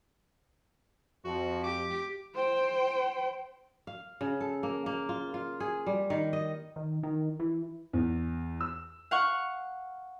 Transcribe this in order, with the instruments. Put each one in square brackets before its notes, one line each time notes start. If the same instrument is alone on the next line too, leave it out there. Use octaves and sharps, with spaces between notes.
[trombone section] F2 [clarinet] F#4
[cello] G4 [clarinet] D6
[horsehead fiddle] C5 G5
[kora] F5
C#3
A4
A#3
A#3
F4
F4
G#4
G3
D#3
D#5
[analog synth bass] D#3
D#3
E3
[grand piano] E2
E6
[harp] F5 F#5 C#6